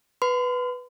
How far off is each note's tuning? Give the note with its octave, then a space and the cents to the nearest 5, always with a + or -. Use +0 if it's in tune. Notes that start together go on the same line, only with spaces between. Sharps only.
B4 +0 C6 -45